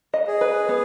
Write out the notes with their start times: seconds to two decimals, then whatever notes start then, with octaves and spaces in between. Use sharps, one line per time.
0.14 D#5
0.27 G#4
0.41 B4
0.69 B3